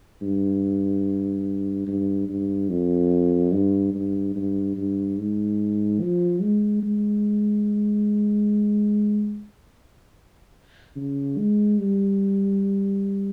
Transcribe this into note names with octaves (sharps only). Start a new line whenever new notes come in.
G2
G2
G2
F2
G2
G2
G2
G2
G#2
F3
G#3
G#3
C#3
G#3
G3